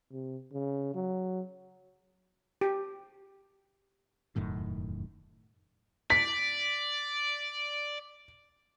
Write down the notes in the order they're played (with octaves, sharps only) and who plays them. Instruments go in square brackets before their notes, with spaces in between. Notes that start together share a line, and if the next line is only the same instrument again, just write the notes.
[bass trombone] C3
C#3
F#3
[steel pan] G4
[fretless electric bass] E1 F#2 A2 D#3
[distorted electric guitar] D5 [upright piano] B6